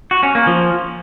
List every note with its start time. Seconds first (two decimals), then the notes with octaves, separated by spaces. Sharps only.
0.11 F#4
0.23 C#4
0.35 A#3
0.47 F3